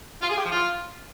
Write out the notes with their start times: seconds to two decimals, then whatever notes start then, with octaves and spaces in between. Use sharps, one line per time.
0.22 F4
0.30 G#4
0.37 G4
0.45 F3
0.52 F4